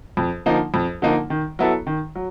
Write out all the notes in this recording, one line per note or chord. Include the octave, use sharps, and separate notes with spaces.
F2
D3 F3 A#3 D#4
F2
D3 F3 A#3 D#4
D#3
F#3 B3 E4 A4
D#3
F#3